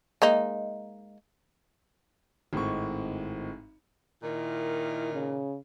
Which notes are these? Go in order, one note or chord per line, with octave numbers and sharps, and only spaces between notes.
G#3 A#3 D#4
G#1 A2 G#3 C4 C#6
A#2 D#3 E4
C#3